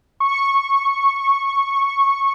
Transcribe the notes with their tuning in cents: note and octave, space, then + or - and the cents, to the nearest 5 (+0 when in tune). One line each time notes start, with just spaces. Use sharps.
C#6 -10